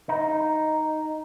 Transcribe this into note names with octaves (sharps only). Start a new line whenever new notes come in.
D#4